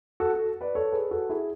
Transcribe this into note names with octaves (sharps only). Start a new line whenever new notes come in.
F#4 A4
F#4 A4
B4 D5
A4 C#5
G#4 B4
F#4 A4
E4 G#4